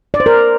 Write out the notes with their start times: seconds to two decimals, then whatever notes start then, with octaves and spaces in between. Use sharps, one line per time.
0.14 D5
0.20 C5
0.26 A#4